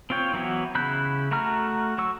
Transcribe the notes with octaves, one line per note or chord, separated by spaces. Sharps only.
C4 F4 C#5 G5
E3 F#3 B3 E4
C#3 E4 B5 F#6 G6
A3 F#4 A#5 F6
F#3 C#6 E6